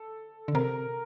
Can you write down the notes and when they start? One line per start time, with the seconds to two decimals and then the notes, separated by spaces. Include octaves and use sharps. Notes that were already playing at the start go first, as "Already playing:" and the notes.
Already playing: A4
0.48 D3
0.55 C3 A#4